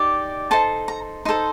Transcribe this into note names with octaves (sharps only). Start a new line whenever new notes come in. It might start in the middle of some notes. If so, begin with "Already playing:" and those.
Already playing: D#4 G4 D5
D#4 A4 C5 A5
A#5
D#4 A4 C5 C6